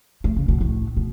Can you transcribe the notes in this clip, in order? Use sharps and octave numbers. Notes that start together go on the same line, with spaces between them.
A3
C#3
B2
A2
B2